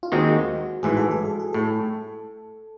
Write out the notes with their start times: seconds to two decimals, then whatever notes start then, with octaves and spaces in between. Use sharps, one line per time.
0.03 F4
0.12 D#2 D#3 G#3 C4 D#4 F#4
0.83 A1 G#2 E3 G#4
0.97 A4
1.11 G#4
1.25 A4
1.39 G#4
1.53 A2 A4